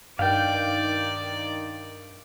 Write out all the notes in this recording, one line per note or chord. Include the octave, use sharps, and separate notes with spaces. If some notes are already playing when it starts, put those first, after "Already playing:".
G2 D#3 D5 F5 G5